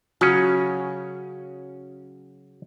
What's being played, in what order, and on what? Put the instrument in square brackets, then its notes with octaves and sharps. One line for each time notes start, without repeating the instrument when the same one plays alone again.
[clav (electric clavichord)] C#3 C#4 [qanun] F#3